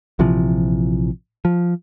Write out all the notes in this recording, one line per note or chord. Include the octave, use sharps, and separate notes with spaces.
A#1 C3 E3 F3
F3